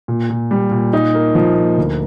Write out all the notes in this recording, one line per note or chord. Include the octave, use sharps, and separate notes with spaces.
A#2
A#2
G3
A#2
D#4
A#3
F3
A#3
D2